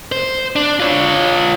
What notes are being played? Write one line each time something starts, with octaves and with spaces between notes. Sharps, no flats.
C5
D4
F4 C#5